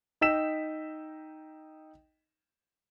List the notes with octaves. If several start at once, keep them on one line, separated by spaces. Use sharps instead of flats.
D#4 D#5 G5 E6 B6 E7